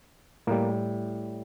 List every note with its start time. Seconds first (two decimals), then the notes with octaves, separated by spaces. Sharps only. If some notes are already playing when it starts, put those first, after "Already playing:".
0.47 A2 G3 A#3